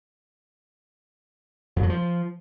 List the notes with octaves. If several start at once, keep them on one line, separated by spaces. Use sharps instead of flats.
F2
F#3
F3